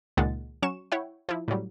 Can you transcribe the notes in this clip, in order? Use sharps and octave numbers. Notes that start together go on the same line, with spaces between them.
C#2 A#2 D#3 G#3 F#5 A6
F#3 C#4 C#6 E7
E4 C#5 E5 F#5 G5
F3 E4
A2 C#3 F#3 G3